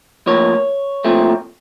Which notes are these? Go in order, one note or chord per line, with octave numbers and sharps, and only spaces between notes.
A2 F3 A#3 C#5
A#2 F3 A3 C4